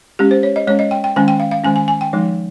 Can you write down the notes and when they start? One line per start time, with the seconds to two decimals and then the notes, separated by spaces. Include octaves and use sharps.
0.19 G#3 C#4 G4
0.31 C5
0.43 C#5
0.56 D#5
0.67 G#3 C#4 C#5
0.79 D#5
0.91 G5
1.04 G5
1.16 D#3 G#3 C#4 G#5
1.28 G5
1.40 F5
1.51 F5
1.64 D#3 G#3 C#4 G#5
1.76 G#5
1.88 G#5
2.01 G5
2.13 F3 G#3 D#4